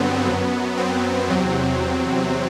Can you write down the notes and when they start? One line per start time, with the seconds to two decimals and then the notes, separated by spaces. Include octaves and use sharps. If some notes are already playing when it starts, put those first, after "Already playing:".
Already playing: G2 D3 F#3 B3 C4
0.27 F#2 F#3
0.77 C4
1.28 E2 C3 F#3